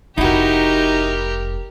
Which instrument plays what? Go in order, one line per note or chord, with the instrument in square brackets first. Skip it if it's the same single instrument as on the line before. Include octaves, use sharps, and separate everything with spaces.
[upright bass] F1 [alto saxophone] D#4 [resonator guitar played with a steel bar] E4 F#4 [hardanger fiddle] G4 A#4